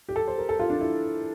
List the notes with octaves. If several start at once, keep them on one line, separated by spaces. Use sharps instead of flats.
G4
A4
C5
A#4
A4
F4
D4
E4